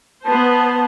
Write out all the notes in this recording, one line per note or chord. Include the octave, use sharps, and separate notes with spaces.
B3 C5 A5